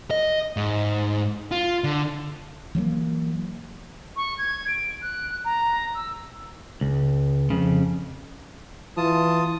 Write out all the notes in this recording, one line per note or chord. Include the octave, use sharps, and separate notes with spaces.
D#5
G#2
F4
D3
E3 F#3 A3 A#3
C#6
G#6
D7
F#6
A#5
E6
C#2
F2 C#3
E3 F4 A5 D#6